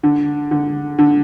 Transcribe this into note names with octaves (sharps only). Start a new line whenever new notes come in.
D3
D3
D3